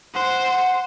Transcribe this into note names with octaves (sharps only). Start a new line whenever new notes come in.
C5 F#5